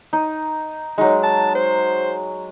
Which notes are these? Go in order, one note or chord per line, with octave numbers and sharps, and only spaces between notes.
D#4
F#3 G#3 D#4
A5
C5